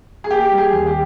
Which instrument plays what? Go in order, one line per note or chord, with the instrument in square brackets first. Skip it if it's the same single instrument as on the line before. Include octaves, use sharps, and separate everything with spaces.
[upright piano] G#4
[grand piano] A#3 [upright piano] G4
[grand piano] G3
[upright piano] G#4
[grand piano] D#2
[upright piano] G4